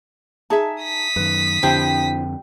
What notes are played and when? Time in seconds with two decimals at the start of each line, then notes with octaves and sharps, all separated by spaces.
0.50 D#4 G#4 E5 A5
0.83 D#6 B6
1.16 F#2 D#3 B4
1.63 F2 D3 C4 D4 E4 G4 C5 G5